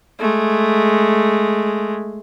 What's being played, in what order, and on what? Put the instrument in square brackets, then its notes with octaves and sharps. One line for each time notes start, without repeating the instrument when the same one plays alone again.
[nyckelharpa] G#3 A3